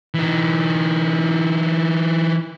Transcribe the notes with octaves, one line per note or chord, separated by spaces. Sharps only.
E3 D#4